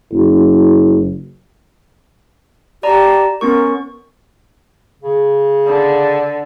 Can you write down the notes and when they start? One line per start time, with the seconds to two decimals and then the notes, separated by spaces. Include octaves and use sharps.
0.12 F#1
2.83 G4 D5 A5 A#5
3.41 B3 C#4 A#4 C#6
5.02 C#3
5.67 D3